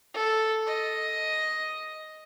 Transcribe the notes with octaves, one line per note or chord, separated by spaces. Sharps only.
A4
D#5